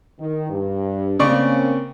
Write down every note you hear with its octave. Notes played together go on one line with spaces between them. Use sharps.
D#3
G2
C#3 A#3 C4 C#4 D5 C#6